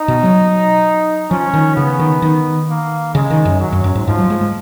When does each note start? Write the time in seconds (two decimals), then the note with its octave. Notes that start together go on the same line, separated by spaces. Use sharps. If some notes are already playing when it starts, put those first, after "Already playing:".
Already playing: D#4
0.08 B2
0.23 F#3
1.30 F3 C#4
1.54 D#3
1.76 C#3 B3
1.99 D#3
2.22 D#3
2.69 A#3
3.14 C#3 G#3
3.30 D#3
3.45 F#2
3.61 F#3
3.72 F#2
3.84 F#2
3.95 G#2
4.07 G#2 F3
4.18 F#3
4.30 G#3
4.41 G#3